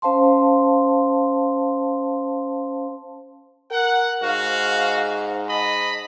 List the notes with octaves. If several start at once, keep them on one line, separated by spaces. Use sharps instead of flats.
C#4 C5 F5 A5 C6
A#4 F#5
G#2 F#4 F5
D#5 A5 B5